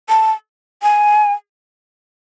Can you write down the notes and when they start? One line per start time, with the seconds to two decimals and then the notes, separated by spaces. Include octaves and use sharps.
0.09 A5
0.83 G#5